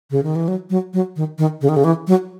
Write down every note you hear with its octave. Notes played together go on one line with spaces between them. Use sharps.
C#3
D#3
E3
F#3
F#3
F#3
D#3
D#3
C#3
D#3
C#3
E3
F#3